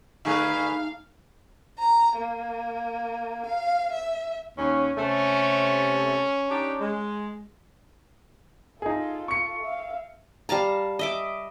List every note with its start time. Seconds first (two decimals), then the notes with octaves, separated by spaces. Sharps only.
0.25 D3 A3 D#4 G4 G#4 B4 F5
1.79 A#5
2.17 A#3
3.47 F5
3.93 E5
4.58 D#2 C#4
4.97 C3 A3 C#4
6.49 D4 D#4 G4
6.80 G#3
8.82 D#4 F4 G#4 A4
9.28 C#6 C#7
9.63 E5 F5
10.49 G3 F5 A5 A#5
10.99 D#5 E5 D6